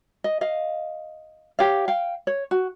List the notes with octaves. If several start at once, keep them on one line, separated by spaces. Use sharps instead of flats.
D#5
D#5 F5
G4 C#5 F5
F5 G5
C#5
F#4